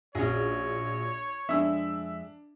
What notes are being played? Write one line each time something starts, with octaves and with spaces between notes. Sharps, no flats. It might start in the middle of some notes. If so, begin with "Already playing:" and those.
A#1 C#4 F#4 G#4 C#5
F2 G#3 D4 E5 E6